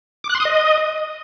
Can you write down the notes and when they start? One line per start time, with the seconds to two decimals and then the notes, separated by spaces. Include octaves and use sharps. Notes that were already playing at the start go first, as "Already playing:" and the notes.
0.24 D6
0.29 F#6
0.35 C6
0.40 D#6
0.45 D#5